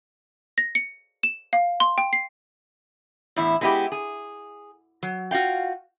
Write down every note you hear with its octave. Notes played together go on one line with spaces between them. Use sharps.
A#6
C#7
E7
F5
C6
G5
C7
E2 A2 E4
G#3 B3 E4 F4 G4
G#4
F#3
F4 F#4 D5 F5 G5